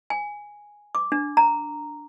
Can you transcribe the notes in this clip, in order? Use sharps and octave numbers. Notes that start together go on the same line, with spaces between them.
G#5
D6
D4
A#5